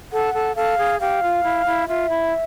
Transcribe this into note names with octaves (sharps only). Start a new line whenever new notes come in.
A4 F#5
A4
A4 F5
G#4
G4 F5
F4
E4
E4
F4 E5
E4